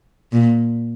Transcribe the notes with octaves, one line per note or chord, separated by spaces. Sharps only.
A#2